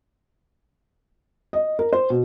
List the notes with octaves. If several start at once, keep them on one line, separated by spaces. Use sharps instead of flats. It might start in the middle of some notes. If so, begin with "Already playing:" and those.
D#5
A#4
C5
B2